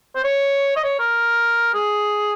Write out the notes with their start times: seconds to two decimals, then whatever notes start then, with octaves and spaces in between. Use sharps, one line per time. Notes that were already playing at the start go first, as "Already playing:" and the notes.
0.15 C5
0.24 C#5
0.76 D#5
0.84 C#5
0.99 A#4
1.74 G#4